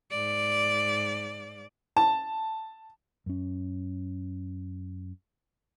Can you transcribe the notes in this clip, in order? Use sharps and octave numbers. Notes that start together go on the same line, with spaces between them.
G#2 D5
A5
F#2 C#4